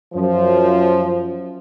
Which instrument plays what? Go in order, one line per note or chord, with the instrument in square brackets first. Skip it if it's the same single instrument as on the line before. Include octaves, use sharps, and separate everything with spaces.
[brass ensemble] F#2 F3